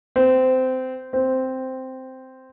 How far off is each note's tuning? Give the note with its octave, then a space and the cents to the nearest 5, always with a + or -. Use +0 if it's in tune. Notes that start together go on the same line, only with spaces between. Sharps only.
C4 -20
C4 -5